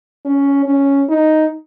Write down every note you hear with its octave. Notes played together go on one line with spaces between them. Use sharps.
C#4
C#4
D#4